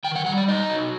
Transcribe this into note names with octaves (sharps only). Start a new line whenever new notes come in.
D#3 G5
F#5
G3 F#5
D5
D#4 D#5
F#3